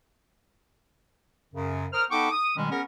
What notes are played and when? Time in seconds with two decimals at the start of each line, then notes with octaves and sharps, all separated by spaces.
1.54 F#2 C#3
1.93 A#4 C5 D#6 F6
2.11 B3 D#4 A4 G5 C#6 D6
2.31 D#6
2.57 B2 D#3 G3 G#3 C#4
2.70 B3 C#4 G#4 A#4